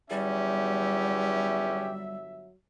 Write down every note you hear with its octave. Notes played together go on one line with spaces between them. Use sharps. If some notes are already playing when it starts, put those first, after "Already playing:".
G1 E2 F#3 G3 C#4 G4 E5